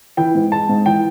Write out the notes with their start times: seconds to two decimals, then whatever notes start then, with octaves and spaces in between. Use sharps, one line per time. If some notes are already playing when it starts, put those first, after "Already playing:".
0.17 E3 G5
0.35 G#2
0.52 G#3 A5
0.69 G#2
0.86 E3 G5